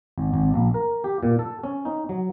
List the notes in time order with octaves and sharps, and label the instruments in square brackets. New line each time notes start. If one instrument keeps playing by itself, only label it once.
[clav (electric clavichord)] G#1
G#1
A#1
A#4
G4
A#2
A4
C#4
D#4
F#3